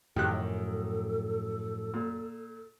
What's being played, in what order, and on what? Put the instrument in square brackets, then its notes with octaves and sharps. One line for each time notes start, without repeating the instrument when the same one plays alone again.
[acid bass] F#2 [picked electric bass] A2 F3 [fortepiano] D#3 G4 F#6 [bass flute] A4
[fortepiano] A#2